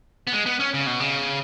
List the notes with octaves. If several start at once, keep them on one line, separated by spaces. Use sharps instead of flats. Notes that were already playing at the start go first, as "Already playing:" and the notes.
B3
G#3
B3
C#4
C#3
B2
C#3